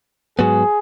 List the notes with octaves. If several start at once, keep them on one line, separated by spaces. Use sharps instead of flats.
G#2 F#3 B3 G#4